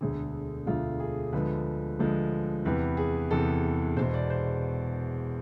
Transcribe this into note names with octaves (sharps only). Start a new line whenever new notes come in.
E1 D2 D3 G#4
E1 D2 D3 F4
G#4
D2 D3 F3 G#3 B4
D2 D3 F3 G#3
E2 C3 E3 B4
G#4
E2 C3 E3 A4
E1 E2 B2 C5
D5
C5